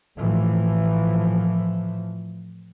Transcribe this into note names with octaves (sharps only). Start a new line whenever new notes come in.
A2 E3 F3